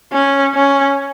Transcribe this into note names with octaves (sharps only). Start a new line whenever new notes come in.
C#4
C#4